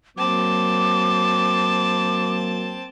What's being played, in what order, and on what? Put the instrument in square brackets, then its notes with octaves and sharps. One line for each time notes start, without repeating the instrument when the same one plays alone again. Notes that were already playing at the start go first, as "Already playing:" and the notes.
[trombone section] F#3 A#3 [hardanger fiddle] C4 A5 [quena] D6